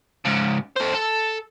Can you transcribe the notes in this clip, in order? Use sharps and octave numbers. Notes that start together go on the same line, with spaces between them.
G#2 C#3
A4 C5
A4